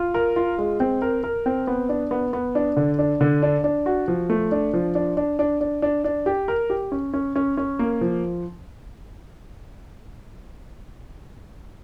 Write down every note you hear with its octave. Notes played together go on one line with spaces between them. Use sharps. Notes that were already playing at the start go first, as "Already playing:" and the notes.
Already playing: F4
A#4
F4
G#3
C4
A#4
A#4
C4
B3
D4
B3
B3
D4
D3
D4
D3
D4
D4
F#4
F3
A3
D4
F3
D4
D4
D4
D4
D4
D4
G4
A#4
G4
C#4
C#4
C#4
C#4
A#3
F3